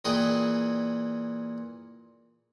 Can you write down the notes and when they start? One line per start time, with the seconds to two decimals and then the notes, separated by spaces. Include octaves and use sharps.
0.05 A#2 E3 G#4 B4 D#5 G5